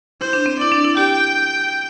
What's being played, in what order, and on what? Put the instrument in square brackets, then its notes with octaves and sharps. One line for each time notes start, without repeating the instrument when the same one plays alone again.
[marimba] E4 [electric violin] C5
[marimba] D4
C4
[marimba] E4 [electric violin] D5
[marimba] D4
E4
[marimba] G4 [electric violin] G5